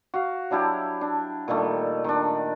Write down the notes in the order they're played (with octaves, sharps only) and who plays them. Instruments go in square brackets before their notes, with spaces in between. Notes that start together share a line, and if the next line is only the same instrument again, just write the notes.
[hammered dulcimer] F#4 F5
F#3 D4 E4 G4
D4
A#2 D#3 G3 A3
D#3 D4